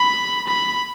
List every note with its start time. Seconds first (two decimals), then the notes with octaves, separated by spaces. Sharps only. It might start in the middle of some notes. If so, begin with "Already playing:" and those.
Already playing: B5
0.47 B5